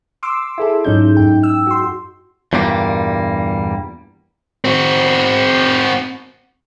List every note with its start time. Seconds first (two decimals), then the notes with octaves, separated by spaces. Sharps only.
0.23 C6 D6 E6
0.58 E4 G#4 A4
0.84 G#2 F#3 C#4 D#4 G6
1.17 F#2 G5
1.43 E6
1.67 F#4 C6
2.53 E2 G2 A#2 G3 A#3
4.65 C4 F#4